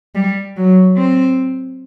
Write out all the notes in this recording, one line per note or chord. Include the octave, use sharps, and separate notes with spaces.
G3
F#3
C4